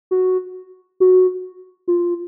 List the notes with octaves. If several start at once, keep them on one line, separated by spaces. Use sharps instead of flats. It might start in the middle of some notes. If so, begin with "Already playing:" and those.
F#4
F#4
F4